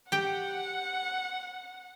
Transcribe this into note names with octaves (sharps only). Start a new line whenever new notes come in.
G4 F#5 G5